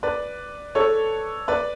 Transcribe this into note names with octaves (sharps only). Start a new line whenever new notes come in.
B4 D5
A4 C#5
B4 D5